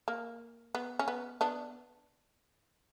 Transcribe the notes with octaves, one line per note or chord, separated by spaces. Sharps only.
A#3
B3
C#4
B3
B3 D4